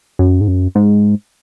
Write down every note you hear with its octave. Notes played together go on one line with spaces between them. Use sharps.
F#2
G#2
F#2
G#2